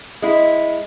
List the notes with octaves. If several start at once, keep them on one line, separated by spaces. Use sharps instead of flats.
G#3 E4